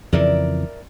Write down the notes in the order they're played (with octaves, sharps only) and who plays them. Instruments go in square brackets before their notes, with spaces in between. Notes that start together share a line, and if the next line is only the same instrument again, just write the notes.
[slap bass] F2 C#3 E3 [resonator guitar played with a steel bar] A#4 D5 E5